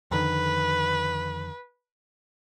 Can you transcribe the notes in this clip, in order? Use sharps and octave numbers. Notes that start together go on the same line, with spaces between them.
F2 D3 D#3 B4